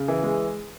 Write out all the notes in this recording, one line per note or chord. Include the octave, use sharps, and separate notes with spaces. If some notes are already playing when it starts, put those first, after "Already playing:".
Already playing: C#3
E3
G#3